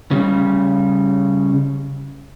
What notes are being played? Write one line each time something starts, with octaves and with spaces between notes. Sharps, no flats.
C#3 G3